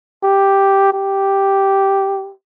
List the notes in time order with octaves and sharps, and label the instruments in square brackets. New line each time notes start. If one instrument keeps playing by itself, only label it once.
[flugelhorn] G4
G4